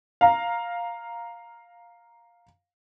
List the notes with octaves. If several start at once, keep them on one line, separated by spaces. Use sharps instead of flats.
F5 A#5